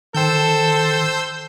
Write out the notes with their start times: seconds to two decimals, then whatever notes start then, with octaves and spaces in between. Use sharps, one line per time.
0.15 D#3 A4 C5 G5 E6 G6